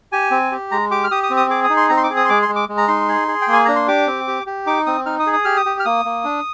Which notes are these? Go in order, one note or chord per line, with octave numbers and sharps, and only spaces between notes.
G4 G#5
C4
G4
G#3 A#5
G4 D6
F6
G4 D#6
D#6
C4
D#6
G#4 D6
D#6
D#4
C6
C4 A#5
C6
D6
G#4
D#6
C6
G#3 D6
C6
G#3
D6
G#3
A#5
D#4 C6
G#4
G#4
G5
A#3
G#5
D4 A#5
C6
G4 D6
C4
G4
G4
D#4 D6
C4 D#6
D#4 F6
D#6
G#4
D#6
G4 F6
D#6
G4
F6
A#3 D#6
A#3
D4